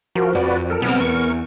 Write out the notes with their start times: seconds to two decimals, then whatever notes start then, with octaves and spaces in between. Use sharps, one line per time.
0.15 F3 F#4 A#4
0.35 F2 F#4 B4 D5
0.70 A4 A#4
0.82 B1 B3 C4 F6
1.00 E2 A#4 C#6